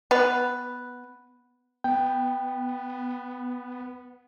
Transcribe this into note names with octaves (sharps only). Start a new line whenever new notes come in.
B3 B4
B3 G5